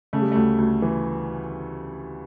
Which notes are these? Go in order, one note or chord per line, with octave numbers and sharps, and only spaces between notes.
C#3 A3
G3
D2 A3
D2
E3